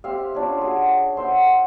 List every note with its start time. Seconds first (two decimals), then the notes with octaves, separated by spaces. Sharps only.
0.04 C4 G4 E5 F5
0.35 C#4 D4 F4
0.61 F#4 G#4
1.17 C5 E5 F#5